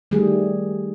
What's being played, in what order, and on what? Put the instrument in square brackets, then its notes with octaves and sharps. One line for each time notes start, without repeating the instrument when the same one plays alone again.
[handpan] D#3 G3 A3 G#4